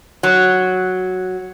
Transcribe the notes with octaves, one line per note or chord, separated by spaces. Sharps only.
F#3